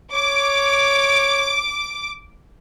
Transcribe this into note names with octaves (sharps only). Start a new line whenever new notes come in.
C#5 D6